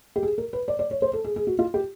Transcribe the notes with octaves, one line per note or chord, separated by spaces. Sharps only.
G4
G#4
A#4
B4
D5
D5
C#5
C5
A4
G#4
G#4
F#4
F4
G4